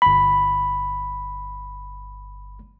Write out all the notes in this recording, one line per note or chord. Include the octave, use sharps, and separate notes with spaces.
G1 B5